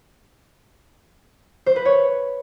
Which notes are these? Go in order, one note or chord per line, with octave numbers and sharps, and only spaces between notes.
C5
B4
C#5